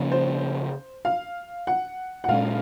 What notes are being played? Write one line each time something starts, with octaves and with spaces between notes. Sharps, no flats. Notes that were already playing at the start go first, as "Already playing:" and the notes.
Already playing: C#3 F3 A#3 C#4
C5
F5
F#5
F#5
A#2 G#3 C#4 F5